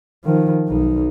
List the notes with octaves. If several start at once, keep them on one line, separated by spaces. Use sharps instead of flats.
D#3 F3
B1 D#4